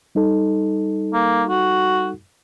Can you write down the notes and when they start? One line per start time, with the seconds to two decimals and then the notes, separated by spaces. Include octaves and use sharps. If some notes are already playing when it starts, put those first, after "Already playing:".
0.15 G3 D#4 A4
1.14 A#3
1.49 F#4